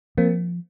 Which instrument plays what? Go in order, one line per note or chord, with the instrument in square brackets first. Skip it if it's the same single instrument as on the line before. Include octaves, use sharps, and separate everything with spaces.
[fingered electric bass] F3 [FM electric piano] A#3 C4